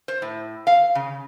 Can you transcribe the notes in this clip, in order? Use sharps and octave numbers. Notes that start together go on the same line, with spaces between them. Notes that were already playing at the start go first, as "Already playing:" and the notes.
C5
A2
F5
C#3